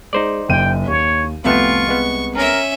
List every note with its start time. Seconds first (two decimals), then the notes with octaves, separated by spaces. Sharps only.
0.13 G#3 D#4 C5 D5
0.49 F#1 G5 D#7
0.87 D#2 C#5
1.44 C2 F2 A3 B3 F4 C#6
1.88 G#3 B3
2.35 C#4 A#4 E5